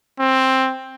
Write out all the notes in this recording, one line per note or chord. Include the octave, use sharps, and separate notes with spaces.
C4